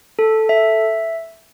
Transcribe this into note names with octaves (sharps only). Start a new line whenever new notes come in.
A4
E5